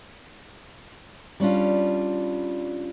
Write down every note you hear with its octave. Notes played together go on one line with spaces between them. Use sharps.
G3 C#4 D4 F4